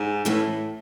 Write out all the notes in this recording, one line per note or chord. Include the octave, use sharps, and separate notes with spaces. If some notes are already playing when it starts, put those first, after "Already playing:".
Already playing: G#2
A2 E3 A3 C#4 E4 B4